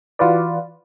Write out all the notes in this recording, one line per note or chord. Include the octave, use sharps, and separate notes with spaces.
E3 F4 F#4 B4 D5